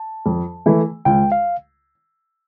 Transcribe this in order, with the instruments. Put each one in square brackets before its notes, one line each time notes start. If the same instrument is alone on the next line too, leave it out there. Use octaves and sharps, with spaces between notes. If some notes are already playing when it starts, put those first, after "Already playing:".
Already playing: [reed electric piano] A5
[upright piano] F2
E3 A3 E4
[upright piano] C#2 [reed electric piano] G5
[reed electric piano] F5